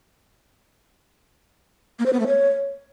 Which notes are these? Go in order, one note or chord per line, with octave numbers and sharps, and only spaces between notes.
A#3
C5
B3
A3
C#5